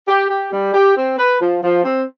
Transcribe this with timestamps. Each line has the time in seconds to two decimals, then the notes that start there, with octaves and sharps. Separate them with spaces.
0.08 G4
0.30 G4
0.52 G3
0.74 G4
0.97 C4
1.18 B4
1.41 F3
1.63 F3
1.85 C4